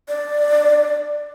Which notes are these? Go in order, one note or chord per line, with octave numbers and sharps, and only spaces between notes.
D5